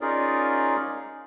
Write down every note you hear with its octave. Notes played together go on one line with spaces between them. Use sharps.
C#4 D#4 F4 G#4 A#4 D5